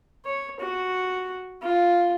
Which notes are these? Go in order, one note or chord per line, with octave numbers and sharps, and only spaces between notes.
C#5
F#4
F4